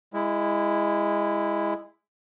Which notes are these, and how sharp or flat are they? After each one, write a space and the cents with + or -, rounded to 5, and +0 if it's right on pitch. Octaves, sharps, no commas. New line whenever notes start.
G#3 -20 E4 +0